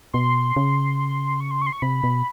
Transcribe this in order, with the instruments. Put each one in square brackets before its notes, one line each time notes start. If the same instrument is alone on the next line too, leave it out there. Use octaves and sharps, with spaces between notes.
[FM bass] B2 [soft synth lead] C6
[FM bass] C#3
[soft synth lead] C#6
C6
C#6
C6
C#6
[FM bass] C3 [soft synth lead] B5
[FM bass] B2